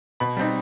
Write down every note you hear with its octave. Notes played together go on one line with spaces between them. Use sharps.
B2 B5
G3 C4 D#4